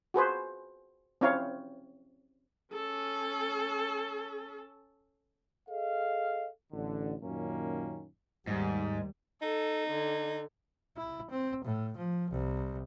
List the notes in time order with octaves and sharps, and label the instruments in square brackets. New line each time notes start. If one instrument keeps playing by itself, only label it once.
[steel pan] F#4 G#4 B4 C5
C4 C#4 E4 C#5 F5
[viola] C#4 A4
[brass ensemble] G#4 A4 D#5 F5
A1 D3
F#2 A#2 D#3 A#3 C#4
[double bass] D#2 G3 [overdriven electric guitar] G#2
[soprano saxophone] D#4 [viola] A4
[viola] D3
[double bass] E4
C4
A2
F3
C2